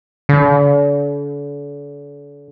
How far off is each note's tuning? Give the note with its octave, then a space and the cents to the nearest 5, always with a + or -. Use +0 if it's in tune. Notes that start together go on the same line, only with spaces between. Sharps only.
D3 -40